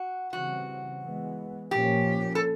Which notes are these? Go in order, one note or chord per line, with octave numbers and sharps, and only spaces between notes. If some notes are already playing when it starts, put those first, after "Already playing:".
Already playing: F#4
C#3 E3 G3 C4 F#4
E3 G#3 B3
A#2 F3 A#3 C#4 G4
A4